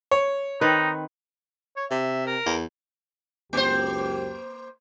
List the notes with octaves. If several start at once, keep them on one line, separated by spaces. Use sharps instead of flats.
C#5
D#3 C4 D#4 B4
C#5
C3 E5
A#4
E2
C#2 F#2 A#3 G4 C5